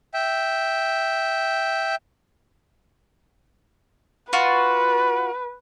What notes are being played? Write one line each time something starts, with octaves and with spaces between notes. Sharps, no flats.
E5 G5
F4 F#4 B4